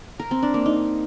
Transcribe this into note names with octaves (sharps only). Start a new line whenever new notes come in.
A#4
C4
D4
A#3
D#4